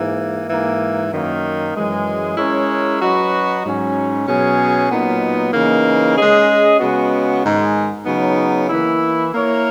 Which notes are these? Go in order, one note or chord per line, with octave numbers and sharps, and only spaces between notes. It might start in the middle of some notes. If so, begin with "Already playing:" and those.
Already playing: G#2 E3 A#3
G#2 E3 A#3
F#2 D#3 A#3
F#2 E3 G#3
G#3 C#4 E4 A#4 C#5
F#3 C#4 F#4 B4 D#5
G#2 F#3 C#4
B2 F#3 C#4 G#4
A#2 F#3 B3 D#4
C#3 E3 A#3 D#4
G#3 C#4 G#4 D#5
C#3 G#3 B3 F#4
G#2 D#3 G#3
C#3 F#3 B3 D#4
E3 A#3 E4
A#3 E4 A#4 C#5